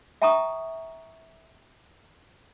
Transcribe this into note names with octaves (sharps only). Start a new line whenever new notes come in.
E5 G5 A5 A#5 C#6 D#6